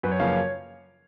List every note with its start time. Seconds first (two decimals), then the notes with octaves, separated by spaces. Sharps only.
0.03 F#2 B4
0.12 C#5
0.20 C#3 F3 A#3 C#4 F5
0.28 C#5